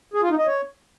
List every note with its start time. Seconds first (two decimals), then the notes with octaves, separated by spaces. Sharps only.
0.14 G#4
0.22 F4
0.30 D#4
0.38 D#5
0.47 C#5